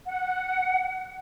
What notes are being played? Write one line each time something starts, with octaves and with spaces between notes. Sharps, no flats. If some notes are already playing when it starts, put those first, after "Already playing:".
F#5